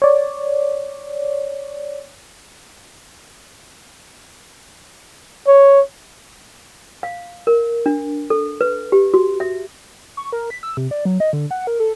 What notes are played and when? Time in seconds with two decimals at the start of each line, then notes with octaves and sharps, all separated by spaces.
0.02 C#5 D5
5.47 C#5
7.03 F5
7.47 A#4
7.86 D4
8.30 A4
8.61 B4
8.92 G4
9.14 F#4
9.40 E5
10.17 C#6
10.32 A#4
10.50 B6
10.63 E6
10.77 C3
10.91 D5
11.05 F#3
11.20 D#5
11.33 D3
11.51 F#5
11.67 A#4
11.80 A4